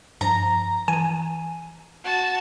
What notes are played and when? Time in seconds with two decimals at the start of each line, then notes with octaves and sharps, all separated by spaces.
0.21 G2 F3 A#5
0.88 E3 G#5
2.04 F#4 A5